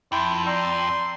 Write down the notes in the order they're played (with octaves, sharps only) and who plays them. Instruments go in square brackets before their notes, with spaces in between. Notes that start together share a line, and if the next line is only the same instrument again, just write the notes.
[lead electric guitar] F2 [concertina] E4 G5 A5 [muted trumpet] C6
[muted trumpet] D5 [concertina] G5 A#5 E6 [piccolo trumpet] C6